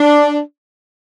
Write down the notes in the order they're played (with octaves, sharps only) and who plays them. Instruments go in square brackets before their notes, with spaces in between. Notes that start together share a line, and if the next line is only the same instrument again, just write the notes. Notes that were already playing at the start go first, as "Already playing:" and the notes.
Already playing: [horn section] D4